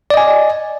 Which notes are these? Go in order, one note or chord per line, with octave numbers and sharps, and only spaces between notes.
D5 D#5 G#5